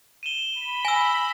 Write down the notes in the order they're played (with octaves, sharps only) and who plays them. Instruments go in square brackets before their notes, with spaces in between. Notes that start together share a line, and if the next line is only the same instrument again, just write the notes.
[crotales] D#7 E7 G7
[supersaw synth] B5
[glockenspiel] G#5 E6 [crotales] A#6